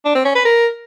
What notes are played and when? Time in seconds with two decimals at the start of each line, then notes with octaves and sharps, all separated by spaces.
0.05 D4
0.15 C4
0.25 C#4
0.35 B4
0.45 A#4